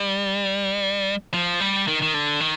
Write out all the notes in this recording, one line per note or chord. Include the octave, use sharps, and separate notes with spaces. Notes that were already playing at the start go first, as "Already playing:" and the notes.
Already playing: G3
F3
G3
D#3
D#3
D3
D#3